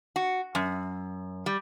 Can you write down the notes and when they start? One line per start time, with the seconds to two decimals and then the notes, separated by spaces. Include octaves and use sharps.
0.16 F#4
0.55 F#2
1.46 G3